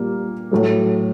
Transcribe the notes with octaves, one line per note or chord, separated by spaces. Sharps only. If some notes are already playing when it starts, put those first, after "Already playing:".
Already playing: A#2 G3 A#3
A2 F#3 A3